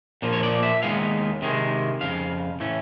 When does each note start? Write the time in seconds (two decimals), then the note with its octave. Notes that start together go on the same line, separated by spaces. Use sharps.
0.22 A#2 F3 A#3
0.33 C#5
0.43 D5
0.63 E5
0.83 D#2 D#3 G#3 B3 F5
1.42 C3 D#3 G#3
2.01 F2 C#3 F5
2.60 A2 E3 A3 C#4